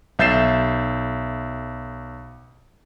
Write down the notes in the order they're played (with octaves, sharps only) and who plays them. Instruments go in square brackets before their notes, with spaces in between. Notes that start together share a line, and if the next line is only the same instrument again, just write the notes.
[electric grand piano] B1 E5 G6 A6 C7 E7